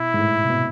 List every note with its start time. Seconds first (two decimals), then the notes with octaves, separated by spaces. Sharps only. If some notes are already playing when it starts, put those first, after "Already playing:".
Already playing: B2 E4
0.14 G#2
0.19 A2
0.44 C3
0.50 B2